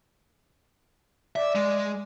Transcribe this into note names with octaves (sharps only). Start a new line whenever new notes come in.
D5 E5
G#3